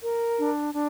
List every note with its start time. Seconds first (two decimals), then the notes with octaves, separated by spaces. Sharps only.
0.03 A#4
0.38 D4
0.74 D4